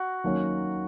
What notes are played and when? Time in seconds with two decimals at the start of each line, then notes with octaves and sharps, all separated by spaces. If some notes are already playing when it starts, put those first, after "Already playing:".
Already playing: F#4
0.24 D#3 F#3 A#3 C#4